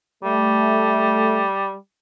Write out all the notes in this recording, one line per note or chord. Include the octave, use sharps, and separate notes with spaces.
G3 A3